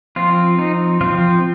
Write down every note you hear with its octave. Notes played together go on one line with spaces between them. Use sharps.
F3 C4 F4
D#4
F3 C4 F4